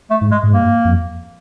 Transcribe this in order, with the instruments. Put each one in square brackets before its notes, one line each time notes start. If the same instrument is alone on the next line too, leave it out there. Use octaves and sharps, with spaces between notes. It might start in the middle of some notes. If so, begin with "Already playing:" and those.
[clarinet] A3
[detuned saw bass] G#2
[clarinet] G#3
[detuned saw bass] G#2
[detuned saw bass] G2 [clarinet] A#3
[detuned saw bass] F2